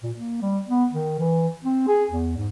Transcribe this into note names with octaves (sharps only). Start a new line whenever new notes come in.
A#2
A#3
G3
B3
D#3
E3
C4
G#4
E2
G#2